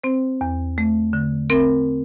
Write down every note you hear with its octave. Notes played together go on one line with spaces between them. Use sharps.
C4 C5
E2
A3
D3
C4 A#4